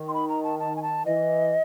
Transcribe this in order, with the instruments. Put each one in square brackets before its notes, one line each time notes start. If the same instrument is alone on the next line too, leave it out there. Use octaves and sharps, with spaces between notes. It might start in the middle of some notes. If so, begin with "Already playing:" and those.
Already playing: [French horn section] D#3
[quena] C6
B5
A#5
A5
A5
G#5
A5
[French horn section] E3 [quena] D#5